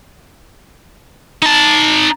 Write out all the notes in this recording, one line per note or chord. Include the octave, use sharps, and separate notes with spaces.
D#4 A5